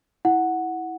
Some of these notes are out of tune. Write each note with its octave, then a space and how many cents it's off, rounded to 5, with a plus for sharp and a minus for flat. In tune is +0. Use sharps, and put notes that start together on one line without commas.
E4 -15 F#5 +0